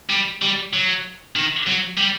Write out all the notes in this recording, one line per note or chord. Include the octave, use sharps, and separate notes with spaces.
G3
G3
F#3
D#3
F#3
G3